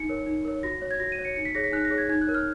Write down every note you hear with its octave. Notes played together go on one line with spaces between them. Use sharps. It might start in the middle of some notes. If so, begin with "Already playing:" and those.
Already playing: D#4 C#7
A#4 C#5
D#4
A#4 C#5
F#4 A#6
C#5
G#6
F#4 A#6
D#7
C#5
C#7
D#4 C#7
B6
G#4 C#5 A#6
B6
D#4 F#6
A#6
G#4 C#5
G#6
D#4 G#6
F#6
A#4 C#5
F6